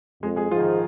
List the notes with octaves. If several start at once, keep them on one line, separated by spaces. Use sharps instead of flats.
F2 G#3 G#4
G#3 G#4
G#2 F3 F4
D#3 D#4